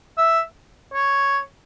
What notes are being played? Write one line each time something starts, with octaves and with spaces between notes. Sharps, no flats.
E5
C#5